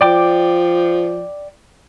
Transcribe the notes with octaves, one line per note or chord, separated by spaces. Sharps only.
F3 D5 G5 D6